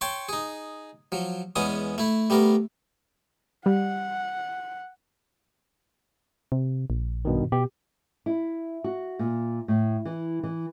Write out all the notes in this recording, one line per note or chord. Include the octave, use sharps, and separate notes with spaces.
C#5 G5 A5 C6 C#6
D#4 G#4
F3 F#3
E2 G#3 B3 C#4 D#6
A3 E4
G3 A3 B3 A#4
G3 F#5
C3
A#1
G2 B2 D#3
B2 G4
E4
F#4
A#2
A2
E3
E3